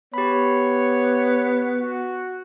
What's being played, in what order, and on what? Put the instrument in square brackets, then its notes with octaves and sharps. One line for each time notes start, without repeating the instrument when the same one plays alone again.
[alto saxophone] B3 [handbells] G4 B5 [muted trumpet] C#5
[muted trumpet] F#4